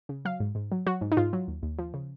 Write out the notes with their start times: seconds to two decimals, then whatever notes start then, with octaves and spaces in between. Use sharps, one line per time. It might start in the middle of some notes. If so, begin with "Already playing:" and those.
0.09 C#3
0.25 F#3 F5
0.40 G#2
0.55 G#2
0.72 F#3
0.86 F#3 F#4
1.01 G#2
1.12 D#4
1.17 G#2 F4
1.33 F#3
1.48 D#2
1.62 D#2
1.78 F3
1.94 C#3